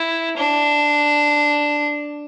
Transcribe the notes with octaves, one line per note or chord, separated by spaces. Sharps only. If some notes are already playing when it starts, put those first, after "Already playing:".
Already playing: E4
D4